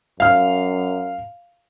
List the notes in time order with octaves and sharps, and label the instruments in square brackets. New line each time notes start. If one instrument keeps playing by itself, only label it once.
[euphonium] F#2 [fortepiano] F5 F6